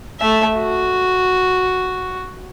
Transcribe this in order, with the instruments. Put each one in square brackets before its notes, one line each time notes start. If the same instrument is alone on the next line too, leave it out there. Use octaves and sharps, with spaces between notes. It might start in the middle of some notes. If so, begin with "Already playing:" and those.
[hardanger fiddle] A3 E5
F#4